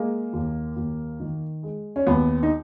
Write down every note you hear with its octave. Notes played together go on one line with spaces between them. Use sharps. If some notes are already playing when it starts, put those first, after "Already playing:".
Already playing: G#3 A#3
D#2
D#2
D#3
G#3
C#4
D#2 B3
D#4